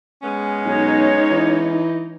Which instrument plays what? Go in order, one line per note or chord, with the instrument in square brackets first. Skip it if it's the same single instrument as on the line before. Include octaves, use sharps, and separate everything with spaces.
[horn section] G#3 B3 C#4
[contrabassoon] B1 [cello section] D#4 [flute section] C#5
[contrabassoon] E3